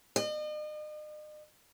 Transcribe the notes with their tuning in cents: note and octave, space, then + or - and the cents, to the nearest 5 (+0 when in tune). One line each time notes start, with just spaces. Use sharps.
D#5 -40